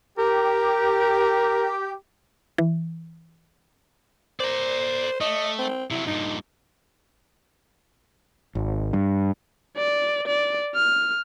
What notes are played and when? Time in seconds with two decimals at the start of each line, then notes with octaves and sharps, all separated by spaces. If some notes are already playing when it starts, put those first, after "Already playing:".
0.18 G4 A#4
2.58 E3
4.40 C5 D5 A#5
5.21 A3 D#5
5.59 C4
5.91 C3 F#3 E4
6.07 G2 A#2 D#4
8.55 G#1
8.93 G2
9.77 D5
10.27 D5
10.75 F6